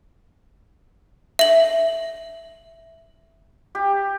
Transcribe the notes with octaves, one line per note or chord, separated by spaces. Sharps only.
E5 F#7
G4